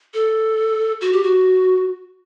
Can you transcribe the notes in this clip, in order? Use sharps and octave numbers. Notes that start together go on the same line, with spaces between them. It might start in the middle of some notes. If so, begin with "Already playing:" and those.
A4
F#4
G4
F#4